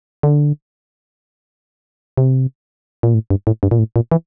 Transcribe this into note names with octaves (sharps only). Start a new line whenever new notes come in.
D3
C3
A#2
A2
G2
A2
G2
A#2
A2
A#2
E3